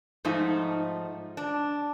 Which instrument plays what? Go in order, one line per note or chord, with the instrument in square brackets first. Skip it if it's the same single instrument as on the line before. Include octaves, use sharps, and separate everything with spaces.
[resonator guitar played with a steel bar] G#2 F3 A3 D#4
D4